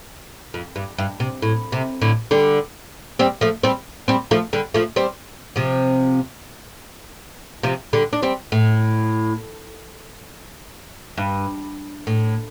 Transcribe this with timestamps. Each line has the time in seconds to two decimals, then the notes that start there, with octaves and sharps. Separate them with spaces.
0.54 F2
0.76 G2
0.98 G2
1.20 C3
1.42 A2
1.72 C3
2.02 A2 D3
2.31 D3 G3
3.19 G3 C4
3.41 F3 A3
3.63 G3 C4
4.08 G3 C4
4.31 F3 A3
4.53 D3 G3
4.74 F3 A3
4.96 G3 C4
5.56 C3 F3
7.63 C3 F3
7.93 D3 G3
8.13 D4
8.22 G3 C4
8.52 A2
11.18 G2
12.07 A2